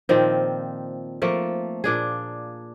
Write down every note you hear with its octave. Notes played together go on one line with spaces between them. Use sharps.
A#2 D#3 F3 C4
F3 A3 A#3
A#2 D4 G#4